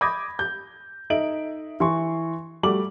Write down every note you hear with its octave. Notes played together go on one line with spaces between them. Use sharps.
B5 D6 D#6 G6 G#6 A#6
G6
D#4 A4 D#5 E5 D7 F#7
E3 C6 C#6
G3 A3 F#4 D6 F#7